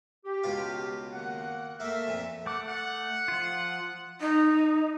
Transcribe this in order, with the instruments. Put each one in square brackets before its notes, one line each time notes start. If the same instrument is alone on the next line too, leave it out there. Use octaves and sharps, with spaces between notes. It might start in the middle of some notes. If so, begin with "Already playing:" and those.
[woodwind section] G4
[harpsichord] C#2 B2 F4
[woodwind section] D#3 A#3 F#5
[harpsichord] A3 A#3 [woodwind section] E5
[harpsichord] F2 A#2
[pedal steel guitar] A3 D6 [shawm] F#5
[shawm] F#5
[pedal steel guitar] F3 F4
[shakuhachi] D#4